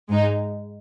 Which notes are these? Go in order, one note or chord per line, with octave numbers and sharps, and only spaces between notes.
G#2 G#3 D#4